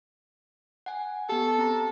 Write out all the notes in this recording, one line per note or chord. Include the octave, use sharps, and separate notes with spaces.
F#5 G#5
B3 G4 A4
C4 A#5